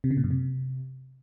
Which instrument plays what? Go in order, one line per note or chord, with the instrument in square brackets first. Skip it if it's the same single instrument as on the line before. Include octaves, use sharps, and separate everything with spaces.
[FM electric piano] C3
C#3
A#2
F#2
C3